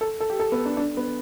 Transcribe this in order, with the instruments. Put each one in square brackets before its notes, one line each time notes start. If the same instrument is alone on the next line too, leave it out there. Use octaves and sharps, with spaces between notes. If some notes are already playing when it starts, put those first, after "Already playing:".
[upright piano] A4
A4
G4
A4
B3
D4
D4
B3